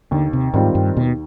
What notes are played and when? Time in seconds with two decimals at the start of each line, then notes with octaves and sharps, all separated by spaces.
0.11 D#2 D3
0.33 C3
0.54 G#2 D#3 G3 C4 F4
0.75 G2
0.97 D#2 B2